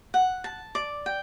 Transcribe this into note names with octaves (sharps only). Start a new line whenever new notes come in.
F#5
A5
D5
G5